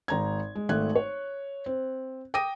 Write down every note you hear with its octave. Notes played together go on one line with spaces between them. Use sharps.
G#1 A#5 G#6
G#3
G#1 A3 F#6 G#6
C#5
C4
G5 D6 D#6 A#6 D#7